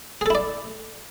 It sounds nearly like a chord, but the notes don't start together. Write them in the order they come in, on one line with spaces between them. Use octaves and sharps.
G#4 A4 E4 D5